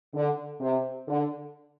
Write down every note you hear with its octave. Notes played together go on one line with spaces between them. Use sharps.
D3
C3
D3